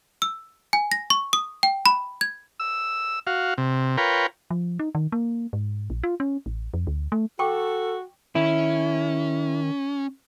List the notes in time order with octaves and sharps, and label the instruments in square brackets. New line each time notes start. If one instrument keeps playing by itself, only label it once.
[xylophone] E6
G#5
A#6
C#6
D#6
G5
B5
G#6
[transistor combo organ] E6
F#4 F5
C3
F4 A#4 B4 C#5 G5
[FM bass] F3
D#4
D#3
A#3
G#2
A#1
F4
C#4
A1
F2
D2
A3
[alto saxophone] F#4 [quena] A4 [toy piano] G5 C#6 D6
[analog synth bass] D#3 [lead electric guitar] C#4 [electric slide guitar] E4